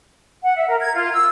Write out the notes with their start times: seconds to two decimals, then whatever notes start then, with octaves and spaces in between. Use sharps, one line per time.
0.43 F#5
0.56 E5
0.68 A#4
0.80 G#6
0.95 F4
1.13 E6